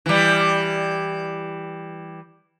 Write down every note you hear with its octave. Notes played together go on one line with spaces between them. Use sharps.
E3 G3